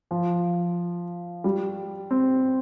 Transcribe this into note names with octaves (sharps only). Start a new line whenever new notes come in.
F3
G3
C4